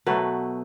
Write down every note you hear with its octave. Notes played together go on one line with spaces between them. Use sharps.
B2 F#3 A3 B4